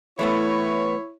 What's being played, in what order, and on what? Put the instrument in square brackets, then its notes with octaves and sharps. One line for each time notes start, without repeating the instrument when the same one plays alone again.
[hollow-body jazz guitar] E3 A3 B3 [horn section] E4 C#5